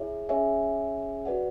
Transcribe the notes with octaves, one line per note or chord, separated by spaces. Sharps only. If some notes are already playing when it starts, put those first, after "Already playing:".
Already playing: E4 G#4 C#5 E5
C#4 G#4 C#5 E5 G#5
F#4 B4 D5 F#5